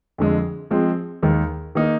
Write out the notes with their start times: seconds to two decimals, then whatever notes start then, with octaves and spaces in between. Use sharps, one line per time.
0.18 F2 D3 G#3
0.71 F3 G#3 C4
1.23 D#2 D#3 G#3
1.75 D#3 A#3 D#4